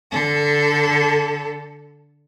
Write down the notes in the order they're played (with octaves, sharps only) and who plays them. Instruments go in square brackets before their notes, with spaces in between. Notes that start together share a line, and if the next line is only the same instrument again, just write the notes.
[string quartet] D3 A4